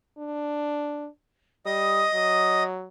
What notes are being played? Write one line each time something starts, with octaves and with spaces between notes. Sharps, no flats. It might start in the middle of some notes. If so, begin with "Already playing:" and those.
D4
G3 D#5 D#6
F#3